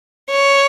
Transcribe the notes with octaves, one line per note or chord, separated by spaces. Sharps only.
C#5